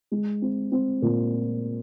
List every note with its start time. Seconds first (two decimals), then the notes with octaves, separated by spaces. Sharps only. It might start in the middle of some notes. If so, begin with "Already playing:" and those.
0.11 G#3
0.42 C4
0.72 C4
1.02 A#2